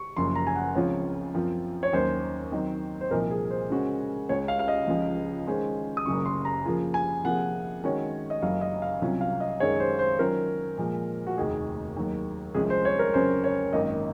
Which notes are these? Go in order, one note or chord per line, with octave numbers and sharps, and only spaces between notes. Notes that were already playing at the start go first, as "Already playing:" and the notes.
Already playing: C#6
F#1 F#2 F3 C6
A#5
G#5
F#5
C#2 C#3 F3 C4 F4 C#5
F#2 F3 C4 F4
C#5
D#2 D#3 F#3 C#4 C5
D#3 F#3 C4 D#4
C5
C2 A#2 F3 A#3 D#4 A#4
G#4
C5
C#3 G#3 C#4 F#4
C#2 C#3 G#3 C#5
F5
F5
D#5
C#2 C#3 F3 G#3
D#3 G#3 C#4 G#4 C5
D#6
F#1 F#2 C#3 F#3 C#6
C6
A#5
C#3 F3 A#3 F4 G#4
G#5
C3 F3 A#3 F4 G#4 F#5
D#3 G#3 C#4 F#4 C#5
D#5
F#1 F#2 C#3 F#3 F5
D#5
F5
C2 C3 F#3 C#4 F4
F5
D#5
F#2 D#3 G#3 D#4 G#4 C#5
C5
C5
D#3 F#3 C#4 F4 A#4 C5
A#2 F3 G#3
F#4
F1 D#2 D#3 A#3 G#4
D#2 D#3 F#3
C2 C3 F3 G#3 C#4 G#4
C5
C#5
A#4
F2 C#3 F#3 C#4 G#4 C5
C#5
G#1 F#2 D#3 A#3 D#5